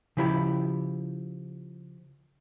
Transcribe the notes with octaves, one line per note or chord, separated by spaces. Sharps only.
C#3 F3 E4 G4 B5